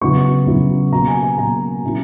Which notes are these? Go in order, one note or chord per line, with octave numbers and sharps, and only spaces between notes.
F#2 C#3 F#3 B3 E4 C#6
F#2 C#3 F#3 B3 E4
B2 F#3 A#3 A#5
G#5
G#5
B2 F#3 A#3 A#5
B2 F#3 C#4 E4